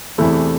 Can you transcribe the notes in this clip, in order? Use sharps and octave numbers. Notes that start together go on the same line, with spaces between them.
E2 C3 E3 A3 E4